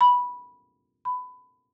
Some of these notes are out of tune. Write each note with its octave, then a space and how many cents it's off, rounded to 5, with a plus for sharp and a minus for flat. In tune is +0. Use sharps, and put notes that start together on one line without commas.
B5 -10
B5 +20